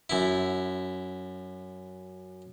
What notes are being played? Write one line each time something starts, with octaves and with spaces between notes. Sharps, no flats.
F#2 E4